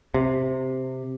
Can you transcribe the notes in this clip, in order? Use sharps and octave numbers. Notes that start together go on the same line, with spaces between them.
C3